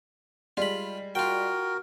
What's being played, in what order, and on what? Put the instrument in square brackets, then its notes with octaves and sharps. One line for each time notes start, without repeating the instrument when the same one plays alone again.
[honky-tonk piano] G3 G#3 [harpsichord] F4 B5
[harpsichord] F4 G5 [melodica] F#4 A#4